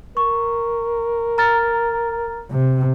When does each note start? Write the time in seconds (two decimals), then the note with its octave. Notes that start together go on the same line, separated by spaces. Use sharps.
0.17 A#4 C#6
1.38 A#5 F6 A6
2.52 C3